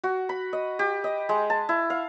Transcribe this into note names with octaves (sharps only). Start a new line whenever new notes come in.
F#4
B5
D#5
G4
D#5
G#3
A5
E4
F5